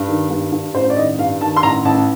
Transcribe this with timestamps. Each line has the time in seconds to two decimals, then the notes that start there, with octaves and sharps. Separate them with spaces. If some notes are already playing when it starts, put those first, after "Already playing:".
Already playing: G2
0.08 D#3
0.30 G2
0.52 G2
0.74 A1 C5
0.90 D5
0.97 D#3 D#5
1.19 G2 F5
1.41 D#3 A5
1.56 C6
1.63 A1 A#5
1.85 A1 A5